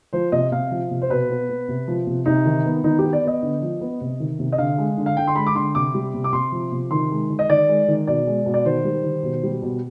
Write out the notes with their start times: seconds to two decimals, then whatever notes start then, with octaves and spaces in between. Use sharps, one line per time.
0.13 F3 C5
0.32 C3 D#5
0.52 C3 F5
0.71 F3
0.91 C3
1.02 C5
1.10 B2 B4
1.29 B3
1.49 B3
1.68 C3
1.88 F3
2.07 C3
2.26 C3 D#4
2.46 D#3
2.65 B3
2.84 D#3 D#4
2.99 B3 G4
3.13 D5
3.23 B3 D#5
3.43 D3
3.62 F3
3.81 B3
4.01 C3
4.20 D#3
4.39 C3
4.52 D#5
4.58 D3 F5
4.78 G#3
4.98 D3
5.06 F5
5.17 D3 G5
5.27 C6
5.36 G#3 B5
5.47 D6
5.55 D3 C6
5.75 C3 D6
5.94 G3
6.14 C3
6.24 D6
6.33 C3 C6
6.52 F3
6.72 C3
6.91 D#3 C6
7.11 G#3
7.30 D#3
7.39 D#5
7.50 D#3 D5
7.68 G#3
7.88 D#3
8.07 B2 D5
8.27 G#3
8.46 B2
8.54 D5
8.65 D#3 C5
8.85 G3
9.04 D#3
9.23 B2
9.43 G3
9.62 B2